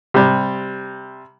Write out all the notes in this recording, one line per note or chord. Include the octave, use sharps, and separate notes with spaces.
C3 G3